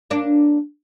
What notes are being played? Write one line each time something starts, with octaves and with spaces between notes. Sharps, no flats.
A#3 D4